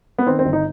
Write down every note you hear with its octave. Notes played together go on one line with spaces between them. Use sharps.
B3
D#3 C4
C4
G1
D#4